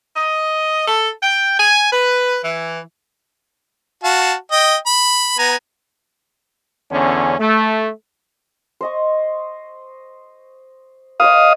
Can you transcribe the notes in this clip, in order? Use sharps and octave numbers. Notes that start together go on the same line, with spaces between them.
D#5
A4
G5
G#5
B4
E3
F#4 F5 A5
D#5 G5
B5
B3 G#5 A#5
E2 D3 C#4
A3
C5 D#5 C#6
B4 C#5 D#5 F5 D#6